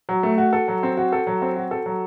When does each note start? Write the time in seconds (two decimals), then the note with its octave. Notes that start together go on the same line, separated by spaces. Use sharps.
0.09 F#3
0.23 A3
0.38 F#4
0.53 A4
0.68 F#3
0.83 C4
0.97 F#4
1.12 A4
1.27 F#3
1.42 C4
1.57 F#4
1.71 A4
1.86 F#3